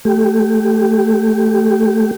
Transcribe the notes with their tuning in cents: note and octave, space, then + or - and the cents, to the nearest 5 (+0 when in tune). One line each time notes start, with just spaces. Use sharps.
A3 +0 G4 +0